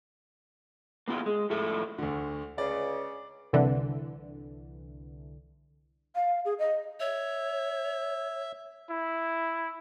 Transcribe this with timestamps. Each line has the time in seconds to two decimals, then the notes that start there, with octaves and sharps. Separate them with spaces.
1.08 A#3 B3 E4 F4
1.26 G#3
1.50 F2 A2 E4 A4 E5
1.98 D2 D3
2.58 C#2 C#3 D5
3.53 C2 D3 E3
6.15 F5
6.45 G#4
6.59 D#5
7.00 C#5 E5
8.90 E4